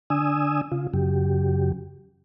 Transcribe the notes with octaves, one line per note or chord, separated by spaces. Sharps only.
D3 D4 G#5 D#6 E6
C#3 F4
F#2 C#3 F#3 G4